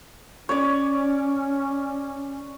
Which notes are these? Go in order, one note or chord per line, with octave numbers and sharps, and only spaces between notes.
C#4 C#5 D5